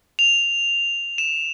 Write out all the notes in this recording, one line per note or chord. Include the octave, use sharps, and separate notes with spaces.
F7
E7